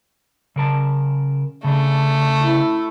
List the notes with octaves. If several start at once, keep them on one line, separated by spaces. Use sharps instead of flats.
C#3 A#4 A5
C#3 A3 D4
E4